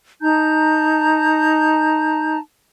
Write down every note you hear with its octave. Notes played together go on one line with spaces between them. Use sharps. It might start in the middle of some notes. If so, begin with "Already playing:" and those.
D#4 A5 A#5 G6